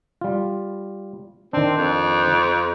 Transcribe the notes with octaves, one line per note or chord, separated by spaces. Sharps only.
G3 F4
D#3 C4 D4
F2